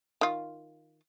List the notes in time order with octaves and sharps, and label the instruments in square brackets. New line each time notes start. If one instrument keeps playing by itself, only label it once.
[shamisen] D#3 F4